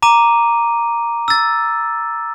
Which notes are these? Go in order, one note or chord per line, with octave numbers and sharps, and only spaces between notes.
A#5 D6 D#7
E6 A6